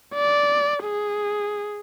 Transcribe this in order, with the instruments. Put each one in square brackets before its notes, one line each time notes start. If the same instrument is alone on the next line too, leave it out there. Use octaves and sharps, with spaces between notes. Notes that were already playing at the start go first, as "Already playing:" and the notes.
[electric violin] D5
G#4